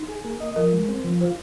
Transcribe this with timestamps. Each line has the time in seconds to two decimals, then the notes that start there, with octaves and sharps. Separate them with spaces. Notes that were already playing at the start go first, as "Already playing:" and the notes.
Already playing: D#4
0.09 G#4
0.24 A#3
0.40 D#5
0.56 F3 A#4
0.73 G#3
0.89 C4
1.04 F3
1.21 F4 C5